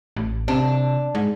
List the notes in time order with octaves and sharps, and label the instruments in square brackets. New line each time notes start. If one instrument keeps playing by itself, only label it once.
[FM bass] A1
[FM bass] C3 [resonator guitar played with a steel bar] D4
[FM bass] G#2